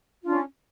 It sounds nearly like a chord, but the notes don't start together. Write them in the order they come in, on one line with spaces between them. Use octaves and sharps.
F4 D4 C#4